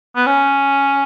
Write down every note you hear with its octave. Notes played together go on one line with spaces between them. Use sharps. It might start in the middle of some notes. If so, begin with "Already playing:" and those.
B3
C#4